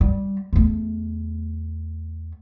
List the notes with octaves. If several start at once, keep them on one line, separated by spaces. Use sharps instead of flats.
G3
E2 A3